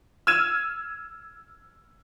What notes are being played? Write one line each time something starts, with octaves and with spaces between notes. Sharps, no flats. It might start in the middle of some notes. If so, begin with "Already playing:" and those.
E6 F6 G#6 D#7 E7